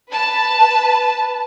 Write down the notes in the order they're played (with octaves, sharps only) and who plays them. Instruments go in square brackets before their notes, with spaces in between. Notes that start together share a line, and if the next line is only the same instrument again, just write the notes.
[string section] B4 A5